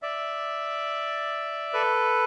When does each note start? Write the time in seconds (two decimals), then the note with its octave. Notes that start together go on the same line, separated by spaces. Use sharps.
0.02 D5 E5
1.73 A4 B4